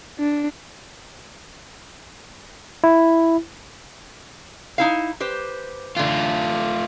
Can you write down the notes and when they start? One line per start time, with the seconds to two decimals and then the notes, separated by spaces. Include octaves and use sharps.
0.19 D4
2.84 E4
4.78 D#4 E4 F5
5.20 G4 B4 C5
5.96 D3 E3 A3 F4